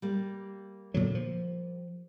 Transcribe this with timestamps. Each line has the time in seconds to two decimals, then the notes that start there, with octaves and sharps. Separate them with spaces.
0.02 G3 A#3
0.94 A#2 D3 F#3
1.15 F3